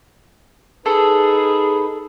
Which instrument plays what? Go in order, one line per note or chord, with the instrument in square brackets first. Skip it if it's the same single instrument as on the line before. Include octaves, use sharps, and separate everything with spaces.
[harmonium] D#4 B4 [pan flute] G#4 [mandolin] A4